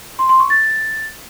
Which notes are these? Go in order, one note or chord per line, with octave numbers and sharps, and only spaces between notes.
C6
C6
C#6
A6